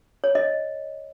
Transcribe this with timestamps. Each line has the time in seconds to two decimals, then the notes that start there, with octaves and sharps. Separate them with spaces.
0.24 C#5
0.35 D#5